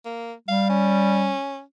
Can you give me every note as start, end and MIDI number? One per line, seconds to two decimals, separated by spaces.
0.05 0.33 58
0.48 1.34 55
0.48 0.67 77
0.69 1.62 61